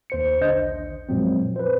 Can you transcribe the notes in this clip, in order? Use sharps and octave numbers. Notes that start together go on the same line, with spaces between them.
D#2 C5 C#7
D3 D4 C5 D#5 G6
A#1
F#2 A#2 F3 F#3 G#3 C4
B4 C5